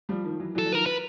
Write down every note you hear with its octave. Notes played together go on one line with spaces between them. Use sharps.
F3 G3
D#3 F3
E3 F#3
E3 F#3 A4
F#3
D#3 F3 A#4
B4